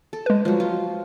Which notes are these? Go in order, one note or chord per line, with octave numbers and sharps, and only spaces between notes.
A4
G#3 B4
F3 F#3
F4